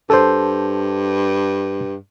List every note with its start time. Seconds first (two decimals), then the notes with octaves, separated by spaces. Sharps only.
0.10 G2 A4 C5